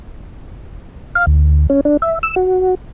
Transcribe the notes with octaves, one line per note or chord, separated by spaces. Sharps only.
F5
D2
C#4
D4
E5
E6
F#4